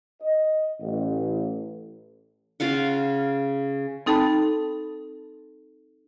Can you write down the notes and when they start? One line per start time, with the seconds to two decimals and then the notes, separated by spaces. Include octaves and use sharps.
0.21 D#5
0.79 A1
2.60 C#3 F4 F5 F#5
4.06 C4 D#4 A4 G5 A5 B5